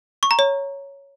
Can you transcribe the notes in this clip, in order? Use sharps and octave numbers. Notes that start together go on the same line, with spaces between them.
C#6
A#5
C#5